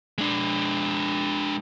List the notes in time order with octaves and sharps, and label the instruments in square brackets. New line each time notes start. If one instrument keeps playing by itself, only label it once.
[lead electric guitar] G#3 D4